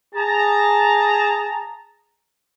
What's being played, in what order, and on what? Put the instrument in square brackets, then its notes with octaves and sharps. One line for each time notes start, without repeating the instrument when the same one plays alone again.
[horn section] G#4 A5 A#5